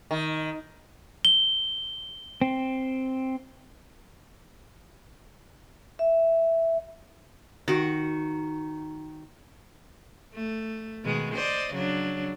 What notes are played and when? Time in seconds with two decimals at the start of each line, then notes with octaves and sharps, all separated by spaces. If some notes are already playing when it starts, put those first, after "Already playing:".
0.11 D#3
1.25 G7
2.42 C4
5.99 E5
7.68 D#3 F#4
10.34 A3
11.04 B2 D#3 G#3
11.34 C5 D5 D#5
11.73 C#3 F#3 D4